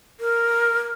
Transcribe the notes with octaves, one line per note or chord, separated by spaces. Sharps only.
A#4